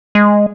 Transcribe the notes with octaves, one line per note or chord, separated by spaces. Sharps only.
G#3